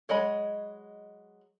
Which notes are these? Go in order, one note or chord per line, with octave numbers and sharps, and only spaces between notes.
F#3 G#3 C#5 D#5 B5